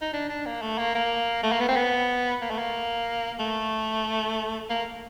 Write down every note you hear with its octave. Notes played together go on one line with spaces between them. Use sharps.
D#4
D4
D4
A#3
A3
A#3
A#3
A3
A#3
B3
C4
B3
A#3
A3
A#3
A3
A#3